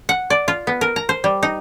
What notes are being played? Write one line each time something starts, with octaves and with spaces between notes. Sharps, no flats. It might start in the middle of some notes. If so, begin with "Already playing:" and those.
F#5
D5
F4
B3
A#4
A#5
C5
G3
D#4